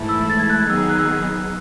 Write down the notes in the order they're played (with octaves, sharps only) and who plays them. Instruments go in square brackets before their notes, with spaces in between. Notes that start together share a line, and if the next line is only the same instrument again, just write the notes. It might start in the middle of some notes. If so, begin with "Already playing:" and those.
Already playing: [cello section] G#2 E3 A3 E4 A4
[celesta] E6
A6
G#6
F#6
G#6
[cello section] D#3 F#3 B3 D#4 G#4 [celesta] E6
[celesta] E6
F#6
E6